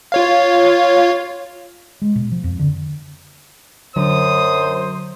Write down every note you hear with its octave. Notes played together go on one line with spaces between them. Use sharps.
F4 C#5 F5
G#3
B2
F3
F2
D3
F#2 D3 F#3 C5 D#6